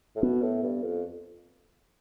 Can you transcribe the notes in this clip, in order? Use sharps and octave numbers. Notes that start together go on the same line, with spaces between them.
A2
B2 B3
A2
G2
F2